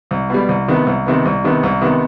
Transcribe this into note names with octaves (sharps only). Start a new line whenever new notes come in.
C2
B2 G3
C2
C3 D#3 B3
C2
C3 D#3 B3
C2
C3 D#3 B3
C2
C3 D#3 B3